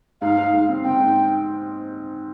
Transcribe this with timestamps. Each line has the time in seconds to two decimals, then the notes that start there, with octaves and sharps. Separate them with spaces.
0.21 G#2 F5
0.37 G#2
0.53 G#2
0.69 C4
0.84 C4 G5
1.00 G#2